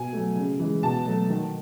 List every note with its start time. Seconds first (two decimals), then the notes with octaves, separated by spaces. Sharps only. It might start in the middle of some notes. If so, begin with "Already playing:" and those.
Already playing: B2 G#5
0.13 F#3 A3
0.36 C#3
0.59 E3 G#3
0.83 B2 A5
1.06 F#3 A3
1.30 D#3